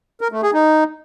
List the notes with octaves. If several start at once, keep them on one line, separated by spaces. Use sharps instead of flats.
A#4
A3
G#4
D#4